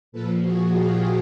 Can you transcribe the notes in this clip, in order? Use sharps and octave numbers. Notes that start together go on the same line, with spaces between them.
A#2 F3 A4 B4
F#4 G#4
F4 G4